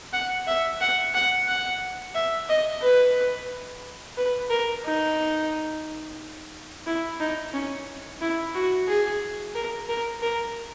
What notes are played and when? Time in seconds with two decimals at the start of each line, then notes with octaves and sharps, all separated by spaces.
0.13 F#5
0.47 E5
0.81 F#5
1.14 F#5
1.47 F#5
2.15 E5
2.49 D#5
2.82 B4
4.17 B4
4.50 A#4
4.85 D#4
6.86 E4
7.20 D#4
7.54 C#4
8.21 E4
8.55 F#4
8.88 G#4
9.55 A#4
9.89 A#4
10.22 A#4